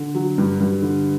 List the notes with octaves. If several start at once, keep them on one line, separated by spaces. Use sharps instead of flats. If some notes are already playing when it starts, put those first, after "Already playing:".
Already playing: D3
F#3
G2
G2
D3